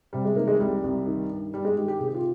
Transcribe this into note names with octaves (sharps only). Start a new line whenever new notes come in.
C3 G3
G#3
D#3 A#3
G#3
C2 G3
C2
D#3
G2
G2 G3
G#3
D#3 G4
G4
C3 G#4
G4
F4